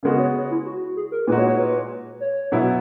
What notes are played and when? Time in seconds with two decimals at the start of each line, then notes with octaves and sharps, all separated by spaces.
0.03 C#3 G#3 B3 F#4 A#4
0.19 C#5
0.50 E4
0.66 F#4
0.96 G#4
1.12 A#4
1.27 A#2 G#3 D#4 F#4 B4
1.38 C#5
1.48 C#5
1.58 B4
2.20 C#5
2.52 B2 F#3 B3 E4